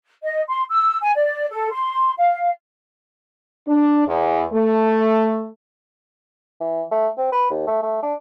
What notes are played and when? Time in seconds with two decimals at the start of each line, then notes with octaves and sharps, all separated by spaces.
0.23 D#5
0.48 C6
0.69 E6
1.01 G#5
1.14 D5
1.49 A4
1.71 C6
2.17 F5
3.68 D4
4.07 E2
4.53 A3
6.61 E3
6.92 A3
7.18 C4
7.32 B4
7.51 D#2
7.67 A3
7.83 A3
8.03 D4